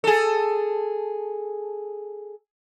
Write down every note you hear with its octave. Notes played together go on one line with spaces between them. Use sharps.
G#4 A4